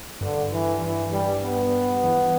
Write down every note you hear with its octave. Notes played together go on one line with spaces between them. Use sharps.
G2 D3
E3
E3
G3
B3
E2